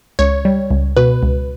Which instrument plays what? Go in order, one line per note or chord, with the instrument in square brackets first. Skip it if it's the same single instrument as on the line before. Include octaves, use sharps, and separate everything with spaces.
[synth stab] C#2 C#5
G3
C#2
B2 B4
C#2